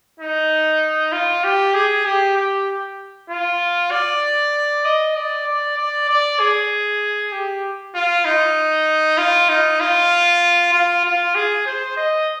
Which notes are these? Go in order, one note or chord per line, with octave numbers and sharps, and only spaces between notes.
D#4
F4
G4
G#4
G4
G4
F4
D5
D#5
D5
D5
D5
D5
G#4
G4
F4
D#4
F4
D#4
F4
F4
F4
G#4
C5
D#5